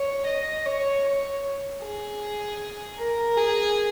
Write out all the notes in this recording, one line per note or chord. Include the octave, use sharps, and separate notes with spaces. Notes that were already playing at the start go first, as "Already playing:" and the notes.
Already playing: C#5
D#5
C#5
C#5
G#4
A#4
G#4